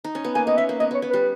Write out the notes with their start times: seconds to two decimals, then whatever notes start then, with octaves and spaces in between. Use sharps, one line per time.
0.04 D#4
0.15 C#4
0.24 B3
0.35 A#3 G#5
0.47 B3 D#5
0.57 C#4 E5
0.69 A#3
0.79 B3 D#5
0.91 B3 C#5
1.02 B3
1.10 G3 B4